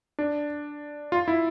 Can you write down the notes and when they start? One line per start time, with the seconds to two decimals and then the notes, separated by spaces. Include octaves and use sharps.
0.19 D4
1.12 F4
1.28 E4